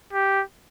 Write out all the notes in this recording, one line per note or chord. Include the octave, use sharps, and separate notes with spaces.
G4